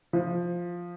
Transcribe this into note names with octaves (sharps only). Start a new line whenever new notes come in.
F3